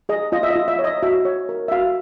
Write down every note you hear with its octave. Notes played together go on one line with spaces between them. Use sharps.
G#4 D#5
F4 D#5
E5
D#5
F4
E5
C#5
D#5
F#4 E5
C#5
A#4
E5
F#4 F5